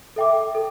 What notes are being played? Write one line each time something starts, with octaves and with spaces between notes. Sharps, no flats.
A4 E5 G5 D6
A4